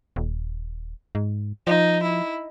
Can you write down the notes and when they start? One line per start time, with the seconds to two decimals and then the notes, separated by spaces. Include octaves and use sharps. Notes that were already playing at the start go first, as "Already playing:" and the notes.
0.16 D#1
1.15 G#2
1.67 F3 D#4
2.02 E4